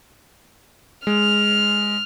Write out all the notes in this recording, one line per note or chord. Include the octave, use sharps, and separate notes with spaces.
G#3 F6